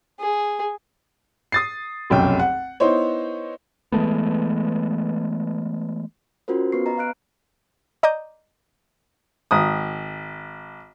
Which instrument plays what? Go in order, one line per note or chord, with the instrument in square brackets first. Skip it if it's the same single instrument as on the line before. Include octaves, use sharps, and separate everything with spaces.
[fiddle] G#4
[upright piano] D#6 A6 C7
F1 B1 F#2 G5
F#5
B3 D#4 E4 C5 C#5
[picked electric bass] E3 G#3 A3 B3
[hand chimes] C#4 F4 F#4 A#4 C5
B3 B4 C#6 C7
B4 D#5 A#5
F5 F6 F#6 D7
[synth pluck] D5 D#5 A#5 D6 D#6 G6
[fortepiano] G#1 D#6